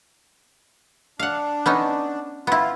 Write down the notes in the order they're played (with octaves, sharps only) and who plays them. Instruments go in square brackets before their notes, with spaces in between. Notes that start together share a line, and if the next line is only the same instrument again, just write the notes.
[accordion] D4 [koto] F5 F#5
[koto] B3 C#4 D#4
[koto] B3 E4 [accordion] F4